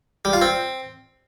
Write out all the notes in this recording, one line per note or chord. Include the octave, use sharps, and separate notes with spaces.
G3
F4
C4